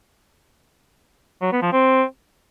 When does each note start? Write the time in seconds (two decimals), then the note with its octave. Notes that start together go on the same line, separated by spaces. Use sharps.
1.42 F#3
1.52 B3
1.62 F3
1.72 C4